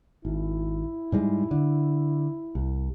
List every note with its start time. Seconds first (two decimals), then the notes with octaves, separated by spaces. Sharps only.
0.25 G#1 E4
1.12 G#2 G3 G#3
1.51 D3
2.55 C2